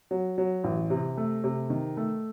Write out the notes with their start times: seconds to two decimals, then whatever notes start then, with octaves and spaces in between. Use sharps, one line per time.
0.11 F#3
0.38 F#3
0.64 A1
0.90 C3
1.17 A3
1.44 C3
1.70 D#3
1.97 A3